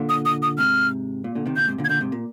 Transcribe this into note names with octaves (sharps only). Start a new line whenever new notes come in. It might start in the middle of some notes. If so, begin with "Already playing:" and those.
Already playing: A#2 D3
D#6
D#6
D#6
G#2 C3 F6
A#2
A#2 D3
C3 D#3
A#2 D3 G6
G#2 C3
A#2 D3
G#6
A#2 D3 G6
G#2 C3
A#2